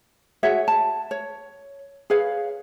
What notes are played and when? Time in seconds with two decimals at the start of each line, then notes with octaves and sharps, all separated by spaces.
0.43 F#4 G#4 C#5 E5
0.68 A5
1.11 C#5
2.10 G#4 B4 C#5 F5